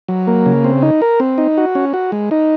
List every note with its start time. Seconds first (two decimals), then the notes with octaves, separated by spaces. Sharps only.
0.08 F#3
0.27 A#3
0.46 C#3
0.64 C4
0.82 D#4
1.02 A#4
1.20 C4
1.38 D#4
1.58 F#4
1.75 C#4
1.94 F#4
2.12 G#3
2.31 D#4